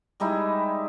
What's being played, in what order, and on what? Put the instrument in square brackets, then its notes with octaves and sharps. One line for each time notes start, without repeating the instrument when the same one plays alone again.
[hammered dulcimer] G3 G#3 D#4 E4